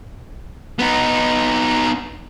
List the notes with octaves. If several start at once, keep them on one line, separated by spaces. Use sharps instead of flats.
B3 D#4